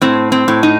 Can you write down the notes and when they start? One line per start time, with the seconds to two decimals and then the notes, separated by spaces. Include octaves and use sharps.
0.01 A2 C4
0.32 C4
0.48 A2
0.63 D#4